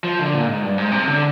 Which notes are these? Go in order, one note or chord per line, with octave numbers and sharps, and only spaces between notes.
F3
D3
A#2
G#2
G2
G#2
C3
D3